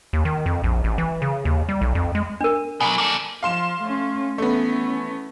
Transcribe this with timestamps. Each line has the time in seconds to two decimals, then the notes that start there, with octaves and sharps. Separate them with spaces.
0.13 D#2
0.25 D#3
0.46 F2
0.64 A#1
0.84 A1
0.98 E3
1.22 C#3
1.45 D#2
1.69 G3
1.81 B1
1.95 F2
2.15 G#3
2.41 D4 A#4
2.80 B2 F#3 G#5
2.98 A#3 A4
3.43 F3 F5 C6 E7
3.82 A3 C#4
4.38 E3 A3 B3 C#4